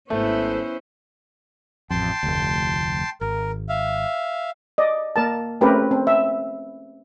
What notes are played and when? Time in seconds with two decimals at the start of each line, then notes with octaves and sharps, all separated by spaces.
0.10 G#1 A3 B3 C#4 E4 C5
1.90 A1 F2 G5 A5 C6
2.23 F1 D2
3.21 G#1 A#4
3.69 E5 F5
4.78 D5 D#5
5.16 A#3 A#4 A5
5.61 A3 C4 C#4 G4 A#4 B4
5.91 C4
6.07 E5